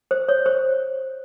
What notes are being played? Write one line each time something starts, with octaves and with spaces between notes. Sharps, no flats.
C5
C#5
C5